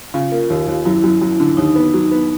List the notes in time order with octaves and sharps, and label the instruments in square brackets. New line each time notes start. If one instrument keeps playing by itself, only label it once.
[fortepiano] C#3 [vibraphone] F4
[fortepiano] A#3
D#2
D#2
[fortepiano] F#2 [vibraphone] E4
[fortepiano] F#2
F#2
D3
[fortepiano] D#2 [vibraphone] D#4
[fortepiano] B3
F#3
B3